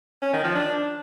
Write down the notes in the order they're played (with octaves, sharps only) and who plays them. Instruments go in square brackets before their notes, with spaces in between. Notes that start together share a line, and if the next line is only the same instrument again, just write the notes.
[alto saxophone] C#4
D#3
F3
D4